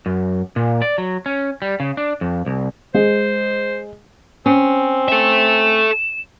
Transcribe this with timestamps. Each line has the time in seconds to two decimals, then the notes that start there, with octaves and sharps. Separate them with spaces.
0.06 F#2
0.56 A#2
0.82 D5
0.98 F#3
1.26 C#4
1.62 G3
1.80 C#3
1.97 D4
2.21 F2
2.46 C2
2.94 G#3 C5
4.46 C4 C#4
5.08 A4 E5 E7